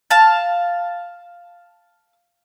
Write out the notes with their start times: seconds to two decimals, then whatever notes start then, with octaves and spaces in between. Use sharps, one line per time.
0.10 F5 A5